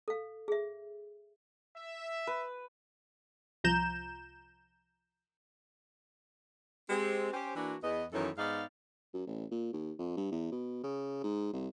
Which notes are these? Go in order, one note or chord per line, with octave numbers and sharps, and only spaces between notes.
A4 F5
G#4 E5
E5
B4
C2 F3 A#5 G6 E7
G#3 C4 G4
C#4 G4 C5
E3 A#3 D4 F#4
E2 B3 D#5
F#2 D#3 E3 B3 A4 C#5
G#2 B3 D#4 D5 F5
F#2
A1
A#2
D#2
F2
G2
E2
B2
C#3
G#2
C2